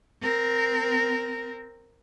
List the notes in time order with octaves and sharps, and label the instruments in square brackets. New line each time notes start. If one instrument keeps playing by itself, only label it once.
[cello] C4 A#4